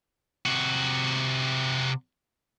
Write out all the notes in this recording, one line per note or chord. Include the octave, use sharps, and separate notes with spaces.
C3 F#4